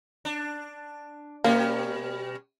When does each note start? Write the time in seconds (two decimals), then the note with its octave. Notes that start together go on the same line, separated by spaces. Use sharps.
0.25 D4
1.44 B2 G3 A#3 C#4